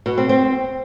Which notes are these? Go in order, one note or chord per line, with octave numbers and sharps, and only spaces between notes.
B2
C4
C4